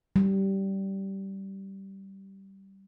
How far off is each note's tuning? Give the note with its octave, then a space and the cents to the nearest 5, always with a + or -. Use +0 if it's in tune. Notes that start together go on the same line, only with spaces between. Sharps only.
G3 -15